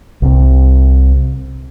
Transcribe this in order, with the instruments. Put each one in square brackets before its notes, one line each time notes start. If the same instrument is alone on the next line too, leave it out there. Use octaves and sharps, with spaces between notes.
[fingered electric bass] C2 C3